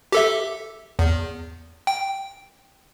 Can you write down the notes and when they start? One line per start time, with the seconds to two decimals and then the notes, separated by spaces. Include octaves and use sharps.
0.12 G4 A4 E5
0.99 E2
1.87 G5